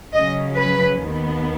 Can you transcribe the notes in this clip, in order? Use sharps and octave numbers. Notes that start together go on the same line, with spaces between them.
C#3 F#3 C#4 D#5
B4
D#2 D#3 B3